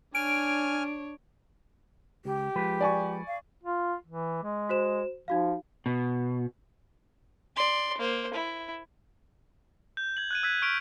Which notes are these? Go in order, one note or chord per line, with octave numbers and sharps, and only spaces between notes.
D4 C#5 G#5 F6 D7
C#2 G4
F3 G#3 B4
D5 G#5 C#6
F5
F4
E3
G#3
F#4 C5 E7
F3 D#4 F#4 F5
B2
D5 C6
A#3 C5
E4
G6
G#6 F#7
F#6 G#6 D#7
E6 F#6 G#6 B6
C#6 F6 B6 D7 F7